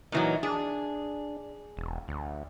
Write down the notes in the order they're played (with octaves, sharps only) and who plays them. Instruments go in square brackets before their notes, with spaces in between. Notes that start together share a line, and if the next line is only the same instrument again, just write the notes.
[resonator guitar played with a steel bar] A#2 E3 F#3 [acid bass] D#4
[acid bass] D4 [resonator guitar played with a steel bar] G#4
[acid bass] E1
D2